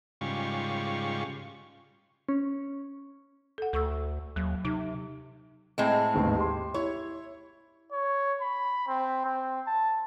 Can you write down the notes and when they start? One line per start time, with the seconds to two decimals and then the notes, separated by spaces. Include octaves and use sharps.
0.21 G#2 C#3 G3 F4 C#6
2.29 C#4
3.58 A4 F#5
3.73 D2 A4 C#6 E6
4.36 D#2 F#3
4.65 C3 D#4
5.78 A2 G#3 C4
6.14 A1 D#2 G#2
6.37 G4 C6
6.74 E4 C#5
7.92 C#5
8.41 B5
8.88 C4
9.25 C4
9.67 A5